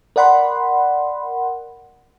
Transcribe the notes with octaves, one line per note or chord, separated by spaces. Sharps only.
A#4 D5 F#5 B5 C6